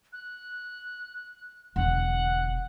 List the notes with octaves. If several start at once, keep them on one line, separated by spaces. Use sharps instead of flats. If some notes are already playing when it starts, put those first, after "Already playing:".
F#6
E1 D3 F#5